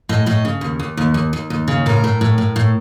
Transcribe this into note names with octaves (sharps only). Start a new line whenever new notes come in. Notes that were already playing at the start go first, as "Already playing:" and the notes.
A2 D#5
A2 D#5
C#3
D#2
D#2
D#2
D#2
D#2
D#2
C#3
A2 A#4
A2
A2
A2
A2